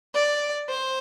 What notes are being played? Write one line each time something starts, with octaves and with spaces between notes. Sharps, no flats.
D5
C5